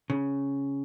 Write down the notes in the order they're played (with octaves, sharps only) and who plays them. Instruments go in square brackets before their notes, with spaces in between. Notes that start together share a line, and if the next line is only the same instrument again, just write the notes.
[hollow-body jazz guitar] C#3